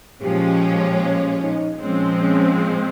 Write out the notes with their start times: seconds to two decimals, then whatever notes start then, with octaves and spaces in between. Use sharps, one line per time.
0.23 A#2 F3 G#3 C#4 G4
1.42 D#4
1.82 A#2 F3 G#3 C4 C#4
2.22 C#4